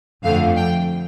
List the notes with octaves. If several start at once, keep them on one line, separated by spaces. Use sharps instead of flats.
F2 D3 A3 F5
G5